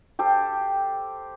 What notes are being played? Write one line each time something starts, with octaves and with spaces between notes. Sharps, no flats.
G4 A4 C5